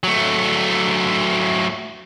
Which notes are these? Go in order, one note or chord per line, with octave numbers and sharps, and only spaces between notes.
F#3 A3